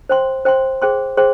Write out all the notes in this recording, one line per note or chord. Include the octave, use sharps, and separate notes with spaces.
C5 G5 C6
C5 G5 C6
G#4 C5 G5 C6
G#4 C5 G5 C6